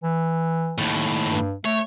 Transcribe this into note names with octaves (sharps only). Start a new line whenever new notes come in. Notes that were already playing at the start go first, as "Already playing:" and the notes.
E3
D#2 A2
G2
A3 C#5